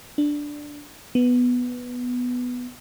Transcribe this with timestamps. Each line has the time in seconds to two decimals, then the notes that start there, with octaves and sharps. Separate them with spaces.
0.18 D4
1.15 B3